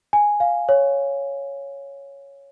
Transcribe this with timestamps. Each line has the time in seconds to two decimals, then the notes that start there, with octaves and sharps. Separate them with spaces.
0.13 G#5
0.40 F5
0.69 C#5